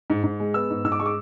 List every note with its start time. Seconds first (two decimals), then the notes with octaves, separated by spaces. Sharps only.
0.10 G#2
0.24 G#2
0.40 G#3
0.54 B3 E6
0.70 G#2
0.84 G#2 E6
0.92 D6
1.00 G#3 C#6
1.06 D6